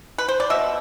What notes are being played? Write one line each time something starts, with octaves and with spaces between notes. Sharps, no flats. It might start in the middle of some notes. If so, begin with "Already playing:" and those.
B4
C5
D5
B2 E5